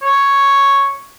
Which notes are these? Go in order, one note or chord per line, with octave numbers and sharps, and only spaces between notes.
C#5